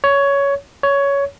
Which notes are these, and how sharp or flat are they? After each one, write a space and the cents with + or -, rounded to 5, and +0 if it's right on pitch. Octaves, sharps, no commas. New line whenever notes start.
C#5 +15
C#5 +15